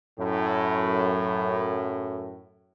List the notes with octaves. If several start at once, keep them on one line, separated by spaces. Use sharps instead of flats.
F#2 A2